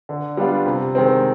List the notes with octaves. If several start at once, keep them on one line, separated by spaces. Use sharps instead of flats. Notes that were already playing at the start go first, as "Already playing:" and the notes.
D3
G3 B3 D4 F4
C3
D#3 G#3 C4